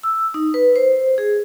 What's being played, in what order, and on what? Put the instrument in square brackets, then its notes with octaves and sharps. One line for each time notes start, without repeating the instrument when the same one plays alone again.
[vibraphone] E6
D#4
B4
C5
G#4